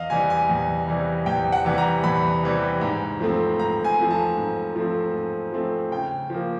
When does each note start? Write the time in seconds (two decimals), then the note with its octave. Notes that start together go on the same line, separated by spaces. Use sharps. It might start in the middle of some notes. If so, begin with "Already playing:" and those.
Already playing: E2 D#5 F5
0.10 C3 E3 G3 G#5
0.30 G#5
0.49 E2
0.87 C3 E3 G3
1.26 E2 G5
1.52 F#5
1.65 C3 E3 G3
1.78 A#5
2.04 E2 B5
2.43 C3 E3 G3
2.81 G#2
3.20 F3 A3 C4
3.59 G#2 A#5
3.84 G#5
3.98 F3 A3 C4
4.10 A5
4.37 G#2
4.76 F3 A3 C4
5.14 G#2
5.52 F3 A3 C4
5.91 C#3 G5
6.30 F3 A#3